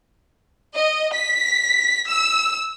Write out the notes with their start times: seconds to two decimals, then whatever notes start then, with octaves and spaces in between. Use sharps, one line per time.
0.77 D#5
1.15 B6
2.08 E6